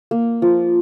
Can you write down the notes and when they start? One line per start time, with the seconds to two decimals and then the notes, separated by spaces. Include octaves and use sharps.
0.11 A#3
0.42 F3